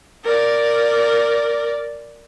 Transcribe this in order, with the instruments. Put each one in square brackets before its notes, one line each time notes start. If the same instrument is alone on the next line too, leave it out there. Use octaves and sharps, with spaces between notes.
[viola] A#4 D5